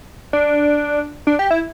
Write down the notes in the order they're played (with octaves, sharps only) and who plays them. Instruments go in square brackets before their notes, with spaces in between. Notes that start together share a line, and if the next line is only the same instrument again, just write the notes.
[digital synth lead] D4
D4
G4
E4